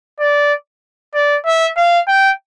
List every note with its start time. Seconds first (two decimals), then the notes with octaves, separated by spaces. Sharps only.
0.20 D5
1.14 D5
1.46 E5
1.77 F5
2.08 G5